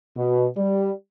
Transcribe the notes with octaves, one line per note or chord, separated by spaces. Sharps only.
B2
G3